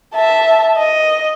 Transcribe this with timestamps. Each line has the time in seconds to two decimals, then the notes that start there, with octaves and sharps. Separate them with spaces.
0.14 E5 A5
0.77 D#5